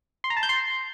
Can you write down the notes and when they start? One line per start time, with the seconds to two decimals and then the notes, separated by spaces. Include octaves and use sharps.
0.24 C6
0.30 A#5
0.37 A5
0.43 G6
0.49 C6